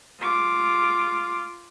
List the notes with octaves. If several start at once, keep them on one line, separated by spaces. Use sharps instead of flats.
F4 D6